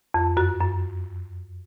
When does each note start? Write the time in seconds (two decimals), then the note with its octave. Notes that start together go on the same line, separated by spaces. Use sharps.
0.14 F2
0.37 F#2 F#4
0.60 F#2